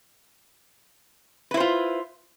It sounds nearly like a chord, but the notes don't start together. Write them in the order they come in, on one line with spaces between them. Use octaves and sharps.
B4 E4 C5 F4